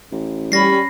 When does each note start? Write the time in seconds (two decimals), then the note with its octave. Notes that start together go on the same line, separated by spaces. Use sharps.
0.11 A1
0.52 G3 C#4 B5 A#6 C7